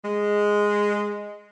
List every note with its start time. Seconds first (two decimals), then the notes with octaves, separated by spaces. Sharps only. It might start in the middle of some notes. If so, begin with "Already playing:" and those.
0.05 G#3